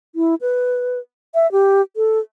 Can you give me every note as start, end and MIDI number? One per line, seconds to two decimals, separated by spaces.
0.15 0.35 64
0.41 0.99 71
1.34 1.50 76
1.52 1.82 67
1.96 2.19 69